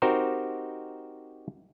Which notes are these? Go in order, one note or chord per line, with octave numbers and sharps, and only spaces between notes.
C4 D#4 F#4 G4 A#4 C5